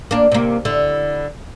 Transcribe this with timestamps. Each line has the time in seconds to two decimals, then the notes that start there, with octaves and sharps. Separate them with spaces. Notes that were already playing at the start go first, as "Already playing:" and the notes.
0.11 A#3 D4
0.32 C3 A#3
0.65 D3 E4